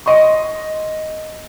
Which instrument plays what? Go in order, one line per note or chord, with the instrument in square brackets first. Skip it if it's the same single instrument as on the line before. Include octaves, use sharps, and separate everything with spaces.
[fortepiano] D#5 C6 C#6